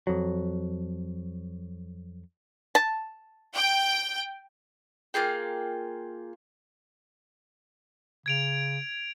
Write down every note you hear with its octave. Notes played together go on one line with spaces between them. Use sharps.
F2 F#3
A5
G5
A#3 F4 G#4 G5
C#3 G#6 D7 F7